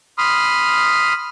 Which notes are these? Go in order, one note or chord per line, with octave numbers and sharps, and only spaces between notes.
B5 C6 D#6 F6